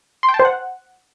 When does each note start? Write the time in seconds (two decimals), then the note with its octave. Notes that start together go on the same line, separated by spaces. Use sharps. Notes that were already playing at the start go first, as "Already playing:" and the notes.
0.23 C6
0.29 G5
0.34 A5
0.39 C5
0.45 F#5